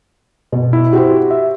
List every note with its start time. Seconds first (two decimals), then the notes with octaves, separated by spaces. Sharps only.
0.52 B2
0.73 E4
0.93 F#4 G4 C5
1.31 E5